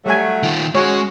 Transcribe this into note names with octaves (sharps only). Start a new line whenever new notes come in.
F#3 G3 A3 G#5
D#3 F4
G#3 C#4 F#4 C#5